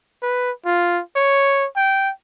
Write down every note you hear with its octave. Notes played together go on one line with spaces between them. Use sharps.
B4
F4
C#5
G5